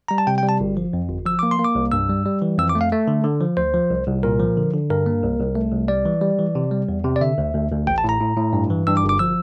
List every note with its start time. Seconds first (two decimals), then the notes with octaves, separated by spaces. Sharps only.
0.08 G3 A#5
0.18 A5
0.27 C3 G5
0.38 G5
0.43 G3
0.49 A5
0.60 G1
0.77 F3
0.93 F2
1.10 G1
1.26 F3 E6
1.39 A#3 D6
1.51 C6
1.59 A#3
1.65 D6
1.75 C2
1.92 G2 E6
2.09 G3
2.25 G3
2.42 E3
2.58 F2 E6
2.69 D6
2.75 A3
2.81 F5
2.92 A3
3.08 D3
3.24 D3
3.40 F3
3.57 D2 C5
3.74 F3
3.91 C2
4.07 C2
4.23 A#2 A#4
4.40 F3
4.57 D3
4.74 D3
4.90 G2 A#4
5.06 A#3
5.23 C2
5.39 C2
5.55 A3
5.72 C2
5.88 G3 D5
6.06 E3
6.22 G3
6.39 E3
6.55 C3
6.71 G3
6.89 E2
7.04 C3
7.16 D5
7.21 D3 E5
7.38 D2
7.55 D2
7.71 D2
7.87 A1 G5
7.98 A5
8.04 A2 A#5
8.21 A2
8.36 A2
8.53 G2
8.70 E3
8.87 G2 E6
8.97 D6
9.04 G1
9.09 D6
9.19 F3 E6